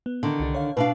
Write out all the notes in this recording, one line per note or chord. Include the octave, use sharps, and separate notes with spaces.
B3
D3 D#3
C2 D4
C#5 F5
B2 D4 B4 F5